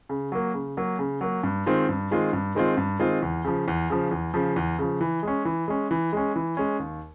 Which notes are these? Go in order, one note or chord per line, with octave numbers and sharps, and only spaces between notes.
C#3
F#3 A#3
C#3
F#3 A#3
C#3
F#3 A#3
G2
D#3 G#3 C4 F4
G2
D#3 G#3 C4 F4
G2
D#3 G#3 C4 F4
G2
D#3 G#3 C4 F4
E2
C#3 F3
E2
C#3 F3
E2
C#3 F3
E2
C#3 F3
E3
G#3 C#4
E3
G#3 C#4
E3
G#3 C#4
E3
G#3 C#4
D#2